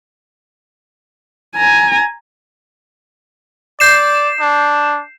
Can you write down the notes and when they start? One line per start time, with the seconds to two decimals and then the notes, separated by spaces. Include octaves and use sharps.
1.56 G#5 A#5
3.80 D5 G6 C7 E7
4.40 D4